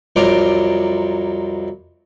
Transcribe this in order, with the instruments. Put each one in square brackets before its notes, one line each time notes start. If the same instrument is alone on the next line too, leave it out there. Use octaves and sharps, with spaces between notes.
[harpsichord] C2 F2 F#3 F4 A#5 D6